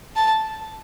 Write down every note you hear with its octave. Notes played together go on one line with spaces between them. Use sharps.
A5